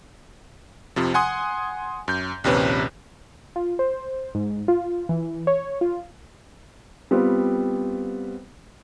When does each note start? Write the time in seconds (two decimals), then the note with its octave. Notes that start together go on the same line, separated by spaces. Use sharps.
0.96 F2 C3 F3
1.14 F#5 G#5 C6 D#6
2.08 F#2 G6
2.44 A#1 D#2 C3 C#4 B4
3.56 F4
3.79 C5
4.35 G#2
4.68 F4
5.09 E3
5.47 C#5
5.81 F4
7.11 G3 B3 C4 F4